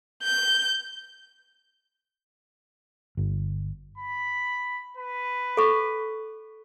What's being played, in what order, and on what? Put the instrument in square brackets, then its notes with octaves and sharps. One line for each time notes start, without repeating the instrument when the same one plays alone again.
[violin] G6
[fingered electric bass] G1
[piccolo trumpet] B5
B4
[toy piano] A4 C#6